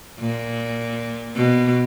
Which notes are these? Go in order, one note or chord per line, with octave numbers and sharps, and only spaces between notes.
A#2
B2